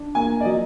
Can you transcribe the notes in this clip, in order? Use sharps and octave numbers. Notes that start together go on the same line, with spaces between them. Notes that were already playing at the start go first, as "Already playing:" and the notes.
Already playing: D4
A#3 G#5
D5
F#3 D#5